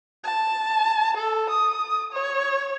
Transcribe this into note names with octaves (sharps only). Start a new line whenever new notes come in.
A5
A4
D#6
C#5